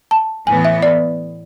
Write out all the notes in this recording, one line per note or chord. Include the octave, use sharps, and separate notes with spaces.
A5
A2 E3 B3 G#5
E5
D5